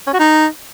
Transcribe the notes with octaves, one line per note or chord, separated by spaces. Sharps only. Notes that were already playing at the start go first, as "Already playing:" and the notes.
C#4
F#4
D#4